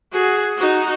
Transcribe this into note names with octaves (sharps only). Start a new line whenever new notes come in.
F#4 G#4
D#4 F#4